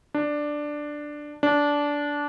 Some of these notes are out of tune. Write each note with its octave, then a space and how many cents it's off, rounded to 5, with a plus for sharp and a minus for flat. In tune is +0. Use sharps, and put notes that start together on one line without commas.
D4 +5
D4 -15